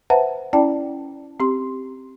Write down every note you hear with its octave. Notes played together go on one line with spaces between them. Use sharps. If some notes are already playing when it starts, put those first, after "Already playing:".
B4 C5 E5 F#5 A5 A#5
C#4 E4 D5 G5 A5
C4 G4 C6